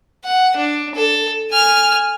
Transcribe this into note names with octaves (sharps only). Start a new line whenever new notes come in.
F#5
D4
A4
G#5 F6